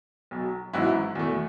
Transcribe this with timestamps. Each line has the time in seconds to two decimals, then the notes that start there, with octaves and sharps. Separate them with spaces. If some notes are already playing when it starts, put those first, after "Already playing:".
0.31 B1 B2 F#3
0.73 A1 G#2 F#3 B3 E4
1.15 E2 B2 A3